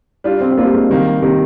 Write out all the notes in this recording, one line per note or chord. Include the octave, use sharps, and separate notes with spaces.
G3 D4 F4
C4
C4
G3 A#3 D4 F4
G#3
C3 D#3 G3 A#3
C3 D#3 A#3